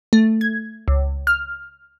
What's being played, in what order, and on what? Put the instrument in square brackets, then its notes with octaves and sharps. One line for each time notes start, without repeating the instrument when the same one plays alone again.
[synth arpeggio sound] A3
G#6
C#2
F6